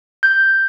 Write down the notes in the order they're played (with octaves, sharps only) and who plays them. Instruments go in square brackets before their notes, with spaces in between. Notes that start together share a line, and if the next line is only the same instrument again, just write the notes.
[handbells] G6